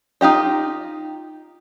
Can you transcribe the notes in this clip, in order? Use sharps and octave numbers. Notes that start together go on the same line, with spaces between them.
D#4 F4 G4 D#5